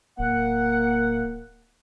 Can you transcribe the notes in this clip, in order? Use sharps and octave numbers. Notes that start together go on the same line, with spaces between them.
D1 A#3 F#5